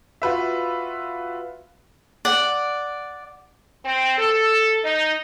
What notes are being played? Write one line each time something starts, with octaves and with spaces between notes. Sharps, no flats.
F4 F#4 B4 E5
D5 F#5
C4
A4
D#4